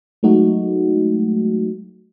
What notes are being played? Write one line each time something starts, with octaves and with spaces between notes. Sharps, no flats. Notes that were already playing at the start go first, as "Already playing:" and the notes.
F#3 G#3 A3 D#4 F#4